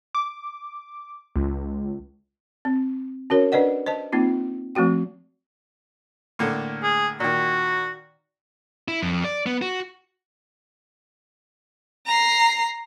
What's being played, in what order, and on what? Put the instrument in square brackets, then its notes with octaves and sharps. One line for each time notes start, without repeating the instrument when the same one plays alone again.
[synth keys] D6
C#2
[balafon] C4
C#4 F#4 A#4 C#5
D4 B4 D5 D#5 F#5
C5 D#5 A5
A#3 C4 D#4 F4
F3 A3 C4 F#4 G5
[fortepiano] A2 D3 A#3
[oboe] G#4
[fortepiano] A#2 D#3 [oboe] F#4
[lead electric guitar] E4
F2
D5
B3
F#4
[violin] A#5 C7